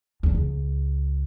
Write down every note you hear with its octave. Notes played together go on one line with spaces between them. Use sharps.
E2 A2
C#2